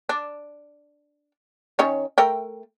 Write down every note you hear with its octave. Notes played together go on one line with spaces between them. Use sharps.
D4
D#3 C#4 C#5
A3 A#4 G5